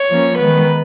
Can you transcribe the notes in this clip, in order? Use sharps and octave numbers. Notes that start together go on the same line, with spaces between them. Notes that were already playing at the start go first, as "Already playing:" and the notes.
Already playing: C#5
F3 A#3 C#4
D#3 G#3 B3 B4